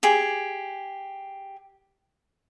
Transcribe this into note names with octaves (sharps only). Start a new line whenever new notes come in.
G4 G#4